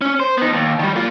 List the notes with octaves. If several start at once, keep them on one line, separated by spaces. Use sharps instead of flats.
C#4
C5
B3 D#4
D#2
D#3 G3
A#3 F4